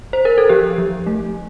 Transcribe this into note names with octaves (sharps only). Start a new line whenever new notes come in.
C5
A#4
A4
F3 G4
F3
A3